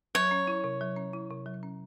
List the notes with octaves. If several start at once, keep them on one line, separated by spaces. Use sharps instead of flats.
F#3 C#5
C#4
E4
C3
F#3
C#4
E4
C3
F#3
C#4